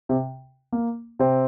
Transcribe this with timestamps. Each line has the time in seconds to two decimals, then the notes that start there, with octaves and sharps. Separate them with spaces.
0.09 C3 C4
0.72 A#3
1.19 C3 C4